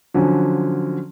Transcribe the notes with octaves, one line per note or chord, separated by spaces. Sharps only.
D3 F3 F#3 C#4